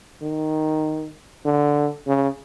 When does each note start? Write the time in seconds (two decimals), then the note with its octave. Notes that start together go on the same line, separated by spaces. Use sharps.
0.22 D#3
1.45 D3
2.07 C#3